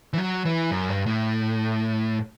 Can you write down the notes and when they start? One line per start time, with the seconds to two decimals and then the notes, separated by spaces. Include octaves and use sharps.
0.13 E3
0.18 F#3
0.45 E3
0.71 F#2
0.89 G2
1.06 A2